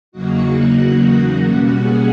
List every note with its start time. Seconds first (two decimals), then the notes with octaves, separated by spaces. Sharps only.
0.12 E2 C#3 F#3 A#3 D#4 F#4 F#5
0.45 F#4 F#5
0.77 F#4 F#5
1.42 B2 G3 A#3 C#4
1.74 G#4 G#5